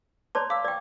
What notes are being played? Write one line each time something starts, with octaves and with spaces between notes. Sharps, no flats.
C#5 D5 A5 A#5 C6
F5 D6 E6
D5 G5